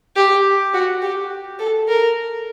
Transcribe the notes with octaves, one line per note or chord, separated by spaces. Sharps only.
G4
F#4
G4
A4
A#4